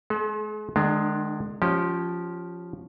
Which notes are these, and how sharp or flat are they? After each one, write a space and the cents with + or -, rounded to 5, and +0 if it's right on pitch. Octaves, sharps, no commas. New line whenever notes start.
G#3 +40 A4 -35
D#3 -40 G#3 +15 D4 +20
F3 +0 C#4 +0 G4 -20